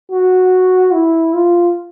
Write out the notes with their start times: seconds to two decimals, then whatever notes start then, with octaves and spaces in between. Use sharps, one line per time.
0.12 F#4
0.93 E4
1.34 F4